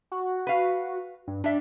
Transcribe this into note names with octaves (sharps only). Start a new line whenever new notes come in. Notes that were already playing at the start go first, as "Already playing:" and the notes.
F#4
B4 F5
G2
G3 D4 E5